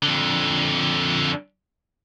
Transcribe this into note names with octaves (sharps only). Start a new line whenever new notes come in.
F2 D3